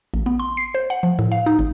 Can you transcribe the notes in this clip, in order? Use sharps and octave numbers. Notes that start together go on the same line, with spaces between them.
A1
B3
C6
C7
C5
F#5
F3
A2
F5
D#4
G#1